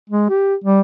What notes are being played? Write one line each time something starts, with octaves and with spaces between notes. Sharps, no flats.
G#3
G4
G3